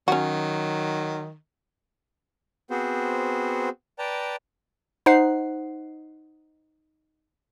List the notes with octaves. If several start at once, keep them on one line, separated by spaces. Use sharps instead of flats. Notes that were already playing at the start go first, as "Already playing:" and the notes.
D#3 F#3 C#4 F#4
B3 C4 F#4 G#4 C5
B4 D5 G5 A5 A#5
D#4 C5 F#5 C7